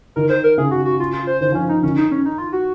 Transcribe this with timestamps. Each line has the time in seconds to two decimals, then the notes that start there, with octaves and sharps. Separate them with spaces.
0.16 D#3 A#4
0.30 C5
0.44 A#4
0.58 C#3 G#4
0.71 F#4
0.85 F#4
1.00 F4
1.13 F4
1.27 C5
1.41 D#3 C5
1.52 F3 C#4
1.69 F3 D#4
1.83 D#3 C#4
1.97 D#4
2.11 C#4
2.26 D#4
2.38 F4
2.53 F#4